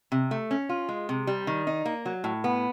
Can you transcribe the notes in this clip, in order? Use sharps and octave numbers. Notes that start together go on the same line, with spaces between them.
C3
A3
C#4
F4
G#3
C3
G3
D#3
D#4
A#3
F#3
A2
B3